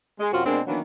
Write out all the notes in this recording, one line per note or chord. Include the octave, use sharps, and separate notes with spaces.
G#3
F#2 C3 C4 F4 F#4
B2 G#3 A#3 C4 D4
D#3 E3 F#3 A#3 B3 D4